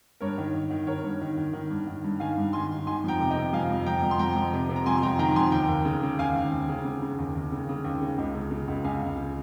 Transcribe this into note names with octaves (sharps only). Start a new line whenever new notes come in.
G2 A#4 C#5
D#3
D#3
D#3
D#3 A#4 C#5
G2
D#3
D#3
D#3
G2
D#3
G2
D#3 F5 G#5
G2
D#3 G#5 C6
D#3
D#3 G#5 C6
F2 G5 A#5
C3
D#5 G5
C3
F2 F5 G#5
F2
F2 G5 A#5
F2
C6
F2 G5 A#5
F2
C3
C3
A#5
F2 G#5 C6
C6
F2 G5 A#5
D#3 G5 A#5
F2 G#5 C6
D#2 G5 A#5
D#2
C#3
C#3
D#2 F5 G#5
D#2
D#2
C#3
C#3
C#3
D#2
D#2
C#3
C#3
D#2
C#3
C#2
C#3
C#3
C#2
C#2 F5 G#5
C#2
C#3